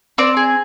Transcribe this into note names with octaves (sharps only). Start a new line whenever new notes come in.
C4 D5
G#4